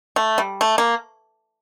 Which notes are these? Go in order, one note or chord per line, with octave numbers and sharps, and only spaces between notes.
A3
G3
A3
A#3